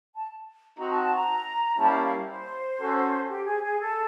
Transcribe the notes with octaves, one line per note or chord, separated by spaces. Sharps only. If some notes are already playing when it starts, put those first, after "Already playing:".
A5
C4 D#4 F#4 A#5
A5
A5
A#5
G3 A#3 C#4 E4 G4 A5
F5
F5
C5
C#4 F#4 A4
G4
G#4
G#4
A4